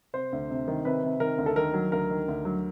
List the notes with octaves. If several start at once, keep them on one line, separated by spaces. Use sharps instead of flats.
C3 C5
D2
C3
D#3
C3 B4
C3
D#3 A#4
D2
A4
D#3 A#4
F#3
D2 A#4
D#3
D2
F#3